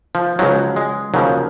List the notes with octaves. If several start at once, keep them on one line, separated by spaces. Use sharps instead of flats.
F3
C#2 C#3 F3 F#3
G#3
D#2 C#3 F3 F#3